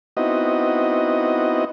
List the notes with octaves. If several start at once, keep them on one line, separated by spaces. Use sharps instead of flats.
B3 C4 D#4 E4 F#4 D#5